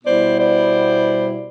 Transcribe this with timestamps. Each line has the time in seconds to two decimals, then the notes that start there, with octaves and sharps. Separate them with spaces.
0.04 B2 G3 B3 E4 C5 D5
0.38 C5 D5